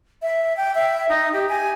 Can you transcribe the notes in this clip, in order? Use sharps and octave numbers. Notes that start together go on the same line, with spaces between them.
E5
G5
E5
D#4
G4
G#5